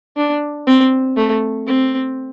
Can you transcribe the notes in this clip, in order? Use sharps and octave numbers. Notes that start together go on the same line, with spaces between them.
D4
C4
A3
C4